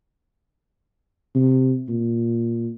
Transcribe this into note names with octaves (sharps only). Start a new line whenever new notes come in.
C3
A#2